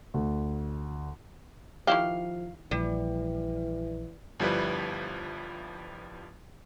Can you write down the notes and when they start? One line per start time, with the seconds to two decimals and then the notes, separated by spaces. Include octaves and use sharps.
0.14 D2
1.87 D#3 F3 E4 G4 F5
2.71 A#1 E3 G3
4.40 G1 F3 G3 E4 B4